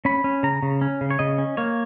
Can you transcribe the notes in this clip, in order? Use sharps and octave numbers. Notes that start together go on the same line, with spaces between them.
C#4 B5
C#4
C#3 A#5
C#3
C#4
C#3
C#5
C#3 D#5
C#4
A#3 C#5